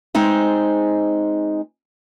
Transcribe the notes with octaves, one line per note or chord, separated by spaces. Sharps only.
G#3 C4 D#4 G#4